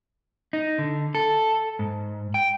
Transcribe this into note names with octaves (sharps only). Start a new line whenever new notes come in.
D#4
D3
A4
G#2
G5